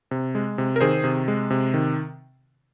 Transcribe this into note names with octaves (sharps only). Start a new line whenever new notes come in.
C3
G#3
C3
A#4
D#3 G#4 C5
C3
G#3
C3
D#3